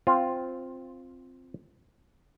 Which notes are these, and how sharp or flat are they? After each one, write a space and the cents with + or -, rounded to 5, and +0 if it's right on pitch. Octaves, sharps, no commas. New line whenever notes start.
C4 +0 F4 +0